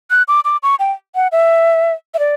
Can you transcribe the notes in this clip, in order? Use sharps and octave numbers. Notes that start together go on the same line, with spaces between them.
F#6
D6
D6
C#6
G5
F#5
E5
E5
D5